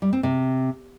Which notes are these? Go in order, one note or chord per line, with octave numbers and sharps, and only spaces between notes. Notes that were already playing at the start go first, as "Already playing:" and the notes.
G3
C4
C3